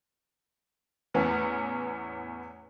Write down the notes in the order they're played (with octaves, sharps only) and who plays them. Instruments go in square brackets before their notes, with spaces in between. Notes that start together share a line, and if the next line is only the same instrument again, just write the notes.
[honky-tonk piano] E2 A2 E3 B3 C#4